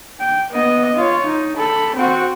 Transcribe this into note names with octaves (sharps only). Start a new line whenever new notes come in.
G5
B3 D#5
F4 C#5
D#4
A4 B5
C4 F#4